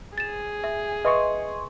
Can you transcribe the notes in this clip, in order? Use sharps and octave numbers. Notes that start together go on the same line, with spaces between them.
G#4 A6 E7
E5
B4 D#5 E5 C6 C#6